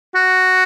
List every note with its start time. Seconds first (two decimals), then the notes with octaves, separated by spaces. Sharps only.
0.15 F#4